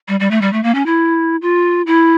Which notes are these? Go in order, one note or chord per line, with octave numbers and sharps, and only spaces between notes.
G3
G3
A3
G3
A3
A#3
C#4
E4
F4
E4